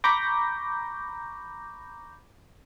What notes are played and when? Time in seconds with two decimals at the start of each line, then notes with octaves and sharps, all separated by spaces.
0.04 A#5 B5 C#6 D6 G6 A#6